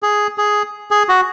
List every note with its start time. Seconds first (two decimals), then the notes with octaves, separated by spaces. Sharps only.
0.03 G#4
0.38 G#4
0.91 G#4
1.09 F#4